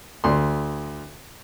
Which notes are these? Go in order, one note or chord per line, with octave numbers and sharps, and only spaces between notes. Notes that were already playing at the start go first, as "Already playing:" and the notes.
D2 C6